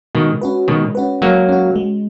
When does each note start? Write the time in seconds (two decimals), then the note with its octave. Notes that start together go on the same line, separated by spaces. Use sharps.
0.15 B2 D#3 G#3
0.41 C#4 F#4 B4
0.68 B2 D#3 G#3
0.95 C#4 F#4 B4
1.22 F#3 G#3 A#3
1.49 C#4 F#4
1.76 G#3